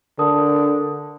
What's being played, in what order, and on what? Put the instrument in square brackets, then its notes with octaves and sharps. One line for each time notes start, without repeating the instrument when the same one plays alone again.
[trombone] D3 [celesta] A#4 A5 D#6